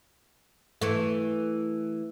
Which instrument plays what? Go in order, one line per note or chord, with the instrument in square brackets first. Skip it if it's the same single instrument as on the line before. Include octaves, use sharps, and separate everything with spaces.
[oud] E3 A3